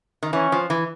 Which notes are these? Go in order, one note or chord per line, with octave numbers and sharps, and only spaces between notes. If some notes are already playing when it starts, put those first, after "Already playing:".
D#3
E3 C#4
F3
E3